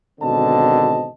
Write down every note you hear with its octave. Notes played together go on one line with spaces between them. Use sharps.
G#1 B2 D3 C4 D#5 A5